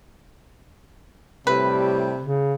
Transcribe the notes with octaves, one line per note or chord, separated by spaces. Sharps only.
A2 C3 G3 B4
C#3